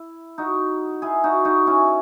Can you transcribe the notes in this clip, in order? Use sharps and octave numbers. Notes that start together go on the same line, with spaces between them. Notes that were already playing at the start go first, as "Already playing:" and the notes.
Already playing: E4
D#4 F#4
E4 G#4
D#4 F#4
D#4 F#4
C#4 E4